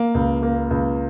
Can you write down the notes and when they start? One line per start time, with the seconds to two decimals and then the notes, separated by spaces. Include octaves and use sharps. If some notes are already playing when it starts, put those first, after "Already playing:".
Already playing: A#3
0.15 C#2
0.43 A#3
0.71 C#2